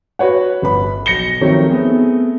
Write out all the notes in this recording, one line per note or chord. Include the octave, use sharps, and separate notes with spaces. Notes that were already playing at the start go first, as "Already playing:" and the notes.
F#4 B4 C#5 F#5
G1 B4 B5
B1 A#6 C#7 G7
D#3 F3 F#3 A3 C4 C#5
A3 B3 C4 G#4